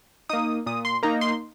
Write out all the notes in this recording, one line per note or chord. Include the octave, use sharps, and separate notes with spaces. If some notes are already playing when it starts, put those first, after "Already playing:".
A#3 D#4 D#6
A#2 D#6
C6
A#3 D#4 A#5
C6